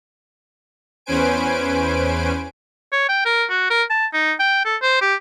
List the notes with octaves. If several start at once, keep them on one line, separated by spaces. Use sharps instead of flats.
E2 C#4 B4 C5 G#5 D7
C#5
G5
A#4
F#4
A#4
A5
D#4
G5
A4
C5
G4